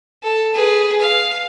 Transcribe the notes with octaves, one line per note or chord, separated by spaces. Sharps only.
A4
G#4 B4
F5